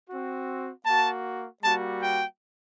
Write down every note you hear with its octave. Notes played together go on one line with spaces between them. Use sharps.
C4 F#4
A#3 F#4 A5
G3 A#3 F#4 A5
G5